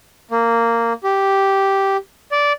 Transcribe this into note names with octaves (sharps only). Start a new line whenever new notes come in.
A#3
G4
D5